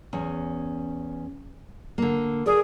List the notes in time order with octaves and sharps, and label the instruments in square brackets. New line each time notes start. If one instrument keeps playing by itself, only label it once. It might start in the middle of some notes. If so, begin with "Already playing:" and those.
[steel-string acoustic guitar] E2 C#4
D3 A#3
[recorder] G#4 [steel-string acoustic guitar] A#4 D5